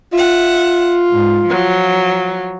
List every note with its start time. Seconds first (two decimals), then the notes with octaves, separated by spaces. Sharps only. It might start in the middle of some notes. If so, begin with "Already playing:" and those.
0.13 F4 E5 F#5
1.11 G#2
1.49 F3 F#3